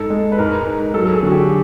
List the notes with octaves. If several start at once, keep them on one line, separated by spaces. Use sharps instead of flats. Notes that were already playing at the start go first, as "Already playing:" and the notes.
Already playing: G#2 A4
G#3
B4
G#2 A#4
G#2
F#3 A4
A4
G#4
D3 F#4
G4